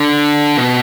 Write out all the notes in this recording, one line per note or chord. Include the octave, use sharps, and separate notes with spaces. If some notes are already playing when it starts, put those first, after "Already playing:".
Already playing: D3
B2